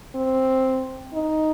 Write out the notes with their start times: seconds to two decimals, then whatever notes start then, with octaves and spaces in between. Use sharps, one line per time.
0.15 C4
1.14 D#4